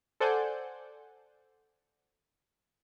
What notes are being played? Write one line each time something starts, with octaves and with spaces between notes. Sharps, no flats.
A4 C5 D5 F#5 G#5 G6